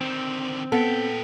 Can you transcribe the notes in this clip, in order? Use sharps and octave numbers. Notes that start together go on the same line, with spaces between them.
D3 D#3 C4
A#2 B3 A4 G5